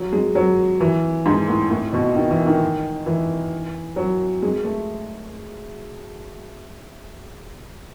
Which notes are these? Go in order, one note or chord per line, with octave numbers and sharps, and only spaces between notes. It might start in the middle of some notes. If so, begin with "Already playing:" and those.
Already playing: F#3
G#3
F#3
E3
G#2
A2
A2
B2
D#3
E3
D#3
E3
F#3
G#3
A3